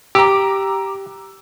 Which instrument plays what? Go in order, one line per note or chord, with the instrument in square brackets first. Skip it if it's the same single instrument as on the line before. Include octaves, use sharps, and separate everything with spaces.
[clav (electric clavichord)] G4 [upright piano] A#5 D6 E6